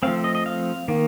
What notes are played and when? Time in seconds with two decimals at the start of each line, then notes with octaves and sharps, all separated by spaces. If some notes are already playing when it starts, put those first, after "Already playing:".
0.03 F3 A3 C4 F5
0.24 D#5
0.35 D#5
0.46 F5
0.88 D#3 A#3